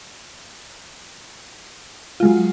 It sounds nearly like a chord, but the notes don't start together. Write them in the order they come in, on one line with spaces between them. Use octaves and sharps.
F4 G#3 F#3